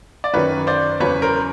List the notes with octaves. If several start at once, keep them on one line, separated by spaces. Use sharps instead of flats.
D5
F#2 D#3 F#3 B4 C#5
C5 D5
E2 C#3 F#3 B4 C#5
A#4 C5